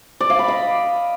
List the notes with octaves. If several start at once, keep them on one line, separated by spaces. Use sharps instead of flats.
D5
F5
B5
D#5